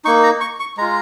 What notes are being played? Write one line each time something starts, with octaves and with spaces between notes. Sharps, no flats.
A#3 D#4 C#6
A#5
C#6
C#6
G#3 F4 A#5